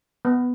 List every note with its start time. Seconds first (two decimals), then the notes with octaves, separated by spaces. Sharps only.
0.25 B3